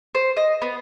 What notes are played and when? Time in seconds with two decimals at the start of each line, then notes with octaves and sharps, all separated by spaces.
0.15 C5
0.37 D#5
0.62 B3